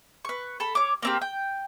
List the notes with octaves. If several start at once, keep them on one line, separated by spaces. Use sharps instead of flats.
B4 C#6
A4 A5 B5
C#5 D6
A#3 C4 G4
G5